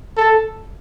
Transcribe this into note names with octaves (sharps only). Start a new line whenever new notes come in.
A4